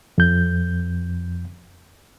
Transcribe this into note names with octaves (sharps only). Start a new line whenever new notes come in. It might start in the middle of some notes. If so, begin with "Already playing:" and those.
F2 G6